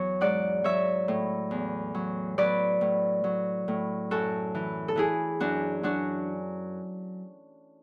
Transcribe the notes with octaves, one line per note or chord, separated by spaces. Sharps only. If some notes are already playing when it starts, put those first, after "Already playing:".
Already playing: E2 F#3 C#5
G#2 D5 F#5
F#3 C#5 E5
A2
E2
F#3
F#3 B4 D5
A2
F#3
A2
F#2 F#4 A4
E3
A4
E3 E4 G#4
F#2 D4 F#4
F#3 D4 F#4